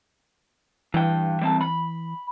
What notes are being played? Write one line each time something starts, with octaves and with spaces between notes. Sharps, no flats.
G2 E3 G5
G3 C4 A5
B5